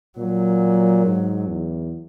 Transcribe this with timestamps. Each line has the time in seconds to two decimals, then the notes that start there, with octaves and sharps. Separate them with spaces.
0.18 A#2 F#3
1.06 G#2
1.47 E2